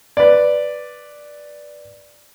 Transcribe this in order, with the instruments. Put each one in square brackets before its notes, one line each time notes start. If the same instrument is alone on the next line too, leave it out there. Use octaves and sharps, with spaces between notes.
[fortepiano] B4 D5